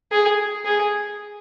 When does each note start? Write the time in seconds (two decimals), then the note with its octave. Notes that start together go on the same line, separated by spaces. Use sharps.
0.12 G#4
0.65 G#4